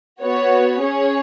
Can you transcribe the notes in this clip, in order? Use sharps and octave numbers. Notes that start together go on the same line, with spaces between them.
B3 F#4 C#5
C#4 G#4 C#5